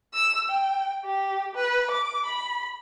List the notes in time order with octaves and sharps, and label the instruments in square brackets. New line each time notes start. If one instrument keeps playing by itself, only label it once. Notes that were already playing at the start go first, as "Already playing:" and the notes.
[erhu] E6
G5
G4
B4
D6
B5